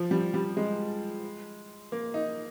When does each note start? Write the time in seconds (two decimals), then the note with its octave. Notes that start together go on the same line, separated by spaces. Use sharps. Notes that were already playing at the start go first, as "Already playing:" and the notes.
Already playing: F3
0.11 G3
0.34 G3
0.57 G#3
1.92 A#3
2.14 D#4